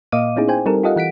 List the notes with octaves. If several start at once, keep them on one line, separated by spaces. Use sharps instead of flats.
A#2 A#3 D#5 F5 D6 D#7
B3 C#4 D#4 E4 G#4
C5 G5 G#5
G3 C4 D#4 G4 A4 A#4
F4 G4 A4 D#5 F5 F#5
E3 F#5 B6 D7